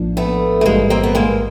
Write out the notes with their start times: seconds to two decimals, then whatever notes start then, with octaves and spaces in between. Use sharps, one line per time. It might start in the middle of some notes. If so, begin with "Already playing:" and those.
Already playing: A#1 A2 F3 A#3 D4
0.17 A3 B3
0.61 A3
0.66 A1 G#2 E3 G3 G#3 A#3
0.90 A#3 C4
1.03 B3
1.15 G#3 A#3